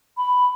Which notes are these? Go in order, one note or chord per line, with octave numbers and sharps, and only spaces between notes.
B5